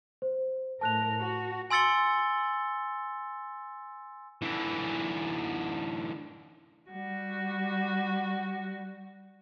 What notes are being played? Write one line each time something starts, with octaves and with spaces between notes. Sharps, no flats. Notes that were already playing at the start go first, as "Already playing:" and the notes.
C5
A2 A#4 A5 F#6 F7
F#4
G#5 C6 E6 A6 C#7 G7
D3 E3
G3 F#4